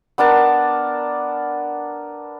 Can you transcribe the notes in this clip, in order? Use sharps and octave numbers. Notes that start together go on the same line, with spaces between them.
B3 D4 A#4 A5